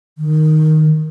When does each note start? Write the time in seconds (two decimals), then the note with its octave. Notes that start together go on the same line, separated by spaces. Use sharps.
0.18 D#3